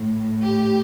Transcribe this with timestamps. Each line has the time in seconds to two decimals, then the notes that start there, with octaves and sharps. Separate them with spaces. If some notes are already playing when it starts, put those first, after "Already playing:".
Already playing: A2
0.43 G4